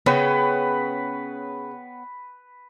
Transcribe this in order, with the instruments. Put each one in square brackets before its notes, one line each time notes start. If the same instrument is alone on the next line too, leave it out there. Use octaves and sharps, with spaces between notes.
[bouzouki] C#3 [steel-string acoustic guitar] B3 C#5 G5 [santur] B4